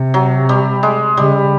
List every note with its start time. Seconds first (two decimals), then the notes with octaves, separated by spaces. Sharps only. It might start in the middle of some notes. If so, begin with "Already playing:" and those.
Already playing: C3
0.14 F#3
0.49 G3
0.83 G#3
1.17 C#3 G3